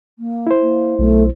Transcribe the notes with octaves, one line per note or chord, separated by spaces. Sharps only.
A#3
E4 C5
A#3
B1 A3